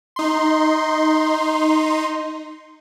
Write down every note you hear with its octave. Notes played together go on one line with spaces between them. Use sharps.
D#4 C6